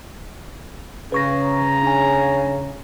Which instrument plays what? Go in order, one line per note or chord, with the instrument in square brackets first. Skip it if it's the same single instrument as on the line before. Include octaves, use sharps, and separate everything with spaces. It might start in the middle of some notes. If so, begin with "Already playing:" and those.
[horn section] C#3 [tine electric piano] B4 C#6 A#6
[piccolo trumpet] A#5
[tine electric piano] D4 G#5